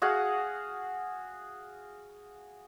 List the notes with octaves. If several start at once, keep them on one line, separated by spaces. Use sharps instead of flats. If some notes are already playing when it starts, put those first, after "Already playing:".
F#4 G#4 F5 F#5